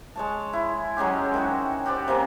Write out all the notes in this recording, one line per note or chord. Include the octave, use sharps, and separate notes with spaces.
G#3 C#5 A5
E4
F#3 G#3 C#4 G4
D#3 E4 F#4 C#5
F#4 G4 C5 D5
C3 A#3 C#4